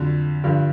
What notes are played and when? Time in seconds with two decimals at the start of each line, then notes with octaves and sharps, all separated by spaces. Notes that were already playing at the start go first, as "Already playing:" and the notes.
Already playing: F2 D3 F#3
0.44 G2 D3 F3